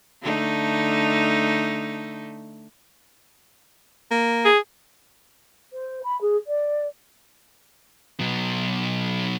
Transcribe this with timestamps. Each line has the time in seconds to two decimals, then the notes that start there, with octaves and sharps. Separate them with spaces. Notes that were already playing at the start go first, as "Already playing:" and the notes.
0.22 D3 A3 D#4
4.11 A#3
4.45 G#4
5.73 C5
6.04 B5
6.21 G#4
6.47 D5
8.20 B2 F#3